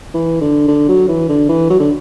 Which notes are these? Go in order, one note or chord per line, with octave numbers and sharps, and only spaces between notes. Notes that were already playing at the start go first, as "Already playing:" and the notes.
E3
D3
D3
F#3
E3
D3
E3
F#3
D3